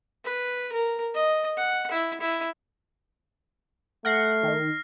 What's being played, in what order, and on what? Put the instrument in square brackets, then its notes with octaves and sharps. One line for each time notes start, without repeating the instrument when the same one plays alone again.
[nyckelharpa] B4
A#4
D#5
F#5
E4
E4
[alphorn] A3 [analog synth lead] F#5 [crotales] F6 A#6 C7
[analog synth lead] D#3